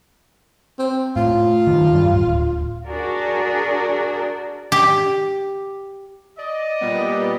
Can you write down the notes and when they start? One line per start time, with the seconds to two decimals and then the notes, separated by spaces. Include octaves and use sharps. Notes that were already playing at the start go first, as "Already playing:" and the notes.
0.78 C4
1.16 A2 F4
1.67 G2 D#3
1.92 G2 G3
2.14 D1
2.88 D4 F#4 G#4 A#4 D5
4.72 G4
6.37 D5 D#5
6.81 A#2 G3 B3